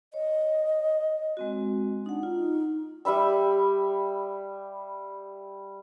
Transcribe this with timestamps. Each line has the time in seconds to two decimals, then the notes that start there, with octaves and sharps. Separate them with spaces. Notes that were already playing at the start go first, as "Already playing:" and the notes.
0.14 C#5 D#5
1.37 G#3 C4 F#4
2.06 D4 D#4 F#5
2.23 D#4 F4
3.05 G3 E5 B5 E6